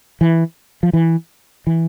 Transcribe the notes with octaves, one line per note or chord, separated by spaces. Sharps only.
E3
F3
E3
E3